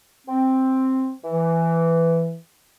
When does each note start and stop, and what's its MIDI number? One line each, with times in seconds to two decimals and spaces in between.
0.27 1.12 60
1.22 2.37 52